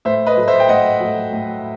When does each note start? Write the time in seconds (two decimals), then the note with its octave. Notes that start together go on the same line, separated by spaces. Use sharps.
0.05 A2 C5 E5
0.26 B4 D#5
0.37 F#3 A3
0.48 C5 E5
0.60 G5
0.68 A2 D#5 F#5
1.00 F#3 A3
1.32 A2